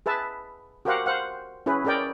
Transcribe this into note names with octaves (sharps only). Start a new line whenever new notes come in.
G#4 B4 E5 A5
F#4 G4 A#4 C5 F5 F#5
C5 F5 F#5
C#4 E4 G#4 B4
C#4 G#4 A#4 D5 G5